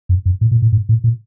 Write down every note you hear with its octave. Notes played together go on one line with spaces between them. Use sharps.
F#2
F#2
A2
A#2
A2
G#2
A2
A#2